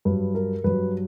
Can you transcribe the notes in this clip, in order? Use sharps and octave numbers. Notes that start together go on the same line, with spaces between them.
G2 F#3 B4
A#4
G2 F#3 B4